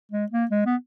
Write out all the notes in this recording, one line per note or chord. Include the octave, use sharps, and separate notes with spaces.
G#3
A#3
G#3
B3